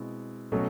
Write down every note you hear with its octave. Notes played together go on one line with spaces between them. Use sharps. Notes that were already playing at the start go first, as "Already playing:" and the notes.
Already playing: B2 G#3 C4 E4
B2 F#3 A3 C#4